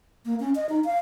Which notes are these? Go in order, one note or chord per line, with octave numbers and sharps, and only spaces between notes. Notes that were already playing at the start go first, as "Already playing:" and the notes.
A#3
C#4
D#5
D#4
F5